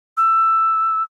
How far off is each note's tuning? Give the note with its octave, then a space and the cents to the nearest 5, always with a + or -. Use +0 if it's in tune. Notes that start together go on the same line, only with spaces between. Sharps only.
E6 +10